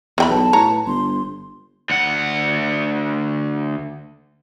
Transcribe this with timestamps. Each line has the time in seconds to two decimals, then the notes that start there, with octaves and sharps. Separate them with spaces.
0.18 E2 E3 G5 B5
0.30 B1 B4 A5
0.53 A2 C#5 A#5
0.86 G1 C6
1.90 D2 F#5